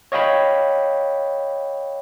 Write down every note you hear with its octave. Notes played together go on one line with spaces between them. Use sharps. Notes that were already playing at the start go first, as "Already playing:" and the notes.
C#5 D#5 F5 G5 B5